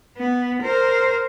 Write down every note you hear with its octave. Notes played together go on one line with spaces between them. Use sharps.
B3
A#4 C5